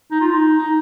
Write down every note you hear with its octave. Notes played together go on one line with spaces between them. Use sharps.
D#4
F4
D#4
D#4